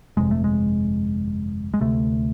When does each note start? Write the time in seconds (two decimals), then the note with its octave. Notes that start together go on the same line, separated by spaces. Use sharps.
0.17 G1 F2 C3 G#3
0.31 A3
0.44 G#3
1.74 G#3
1.81 D2 C3 A3